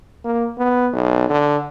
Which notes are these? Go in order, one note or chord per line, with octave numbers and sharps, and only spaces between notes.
A#3
B3
B1
D3